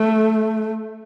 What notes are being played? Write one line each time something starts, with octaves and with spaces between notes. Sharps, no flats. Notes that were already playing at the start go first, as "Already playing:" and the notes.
Already playing: A3